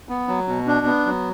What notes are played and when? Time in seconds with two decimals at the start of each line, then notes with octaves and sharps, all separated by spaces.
0.09 B3
0.28 F#3
0.48 B2
0.67 D4
0.86 B3
1.06 F#3